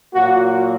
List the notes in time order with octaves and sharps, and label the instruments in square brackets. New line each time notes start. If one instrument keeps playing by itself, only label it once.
[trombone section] A#2 F#3 A#3 F#4